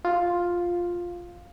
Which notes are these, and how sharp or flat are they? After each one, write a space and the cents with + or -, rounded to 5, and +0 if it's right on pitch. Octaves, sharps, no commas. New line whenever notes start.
F4 +5